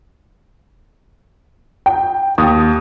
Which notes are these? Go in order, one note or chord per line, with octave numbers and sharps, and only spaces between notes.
G5
D#2 D#6